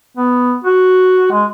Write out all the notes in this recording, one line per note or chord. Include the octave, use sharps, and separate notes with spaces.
B3
F#4
G#3